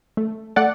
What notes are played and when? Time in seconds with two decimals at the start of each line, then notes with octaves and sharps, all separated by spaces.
0.17 A3
0.56 A3 D5 F#5